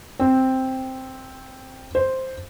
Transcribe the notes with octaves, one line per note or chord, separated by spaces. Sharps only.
C4
C5